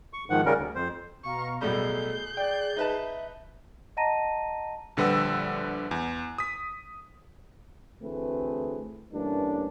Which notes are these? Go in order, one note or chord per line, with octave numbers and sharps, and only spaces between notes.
C#6
G#2 D#3 F3 F#5
C#3 G3 C#4 A#4
D2
F2 C5
B2 F5 A#5 C#6
B1 A2 G3 G#4 A4 G6 C7
D5 G5
D#4 B4 E5 A5
D#5 F#5 A5 A#5 A#6 D#7
A#1 D3 G3 B4 F#5 E6
E2
D#6 B6
D2 E3 A3 C4 G#4 B4
G2 E3 A3 A#3 C#4 D4